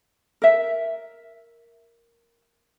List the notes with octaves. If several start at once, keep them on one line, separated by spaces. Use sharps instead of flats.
A#4 E5